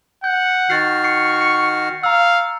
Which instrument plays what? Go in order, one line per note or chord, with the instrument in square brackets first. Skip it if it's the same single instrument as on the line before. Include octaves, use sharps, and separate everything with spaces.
[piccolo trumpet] F#5 [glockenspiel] G6
[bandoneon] D#3 F#4 F6 [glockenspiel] C#6 A6 C7
[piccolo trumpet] C#6 [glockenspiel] C7 C#7
[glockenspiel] C#7
[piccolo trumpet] F5 [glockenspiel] A#5 E6